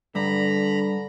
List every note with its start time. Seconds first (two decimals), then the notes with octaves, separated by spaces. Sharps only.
0.15 G2 D3 A#5 B5